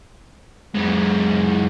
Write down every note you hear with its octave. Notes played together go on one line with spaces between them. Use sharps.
F#2 G#3